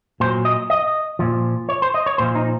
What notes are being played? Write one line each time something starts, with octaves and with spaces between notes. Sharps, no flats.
A#2 F#3 C5
D#5
D#5
A#2 F3
C#5
C5
D#5
C#5
A#2 F3 C5
D#4